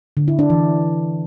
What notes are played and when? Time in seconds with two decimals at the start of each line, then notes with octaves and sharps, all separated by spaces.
0.17 D3
0.28 E4
0.39 D4
0.50 E3